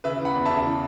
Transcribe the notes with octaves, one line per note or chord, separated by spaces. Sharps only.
C#3 B4 E5
E3
F#5 B5
E2
C#3 E5 A5
E3